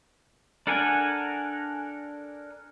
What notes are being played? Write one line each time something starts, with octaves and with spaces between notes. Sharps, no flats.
D4 A4 A#4 F#5 G#5